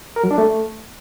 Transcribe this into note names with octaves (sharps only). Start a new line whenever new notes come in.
A#4
F#3
D4
A3